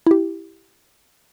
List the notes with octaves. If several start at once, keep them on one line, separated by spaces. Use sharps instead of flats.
E4 G4